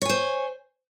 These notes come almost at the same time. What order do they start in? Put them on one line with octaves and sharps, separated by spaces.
C#5 G#5 C5